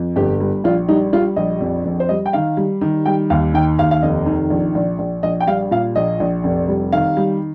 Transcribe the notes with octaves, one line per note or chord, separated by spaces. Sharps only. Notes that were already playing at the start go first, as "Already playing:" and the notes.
Already playing: F2
G1 G4
G3
A#1 F4
G3 D#4
G3 F4
A#1 D#5
F2
F2
C5
G3 D#5
G5
D#3 F5
G3
D#3
G3 G5
D#2 F5
D#3 G5
D#2 F5
F5
F1 D#5
D#3
A#1
A#1
A#1
A#1 D#5
G5
G3 F5
A#2 F5
A#1 D#5
A#1
F1
G3
D#3 F5
G3